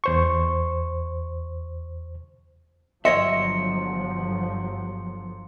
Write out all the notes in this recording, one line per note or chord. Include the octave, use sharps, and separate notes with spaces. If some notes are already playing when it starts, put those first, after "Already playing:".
E2 C5 C#6
G1 F3 F#3 C#5 D#5 E5 C6 C#7